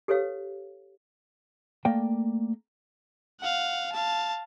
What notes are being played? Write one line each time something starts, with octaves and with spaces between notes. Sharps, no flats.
G4 A4 B4 C#5 F5
A3 A#3 D5 G5
F5 F#5
F5 A5